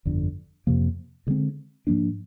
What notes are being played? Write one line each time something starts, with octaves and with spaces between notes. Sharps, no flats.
G1 F2 D3
F2 C3 F3 A#3
D2 D3 G#3 C4
G#2 F3 A#3 D4